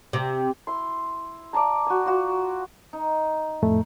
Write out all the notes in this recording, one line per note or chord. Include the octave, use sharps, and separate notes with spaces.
C3
E4 C6
D5 F5 A5 A#5
F#4 G#5
F4 F#4
D#4
F2 A2 A3